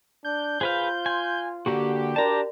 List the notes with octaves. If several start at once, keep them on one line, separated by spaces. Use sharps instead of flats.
D4 G6
F4 G#4 B4 C5 F5
G#5 C6
D3 A#3 F#4 G4
D4 F#4 A#4 D5 A5 A#5